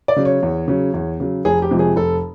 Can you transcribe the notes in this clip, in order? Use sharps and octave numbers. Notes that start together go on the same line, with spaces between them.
D5
C#3 F#3
C#5
E2
C#3 F#3
E2
C#3 F#3
F1 G#4
G4
F2 C3 F3 G#3
G#4
F1 A4